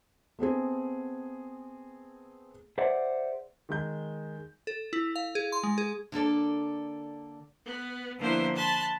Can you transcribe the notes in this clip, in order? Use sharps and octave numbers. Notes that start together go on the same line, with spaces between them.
A3 B3 C4 G#4
G#4 C5 D5 E5 F#5
D#3 G#3 G6
A4
E4
F5
G#4
C6
G#3
G#4
D3 A#3 A4 D5
B3
D3 F3 A#3 B3 E4 C5
A5 B5 C6 F#6